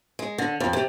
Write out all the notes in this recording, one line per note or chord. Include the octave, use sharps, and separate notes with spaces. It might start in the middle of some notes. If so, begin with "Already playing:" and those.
G#3
D3
F2
C3